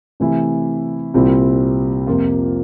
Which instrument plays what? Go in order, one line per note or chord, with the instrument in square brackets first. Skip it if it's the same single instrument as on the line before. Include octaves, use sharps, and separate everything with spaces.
[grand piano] C3 E3 A3 E4
C2 A#2 G3 C4 E4
F2 C3 F3 A#3 F4